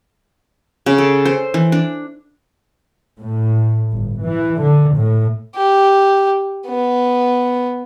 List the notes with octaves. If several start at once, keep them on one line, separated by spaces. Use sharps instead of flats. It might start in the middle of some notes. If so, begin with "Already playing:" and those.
C#3
A4
C5
E3
D4
A2
G1
E3
D3
A2
G4
B3